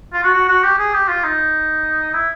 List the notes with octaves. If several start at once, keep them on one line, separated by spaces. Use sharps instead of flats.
F4
F#4
F#4
F#4
G4
G#4
G4
F4
D#4
E4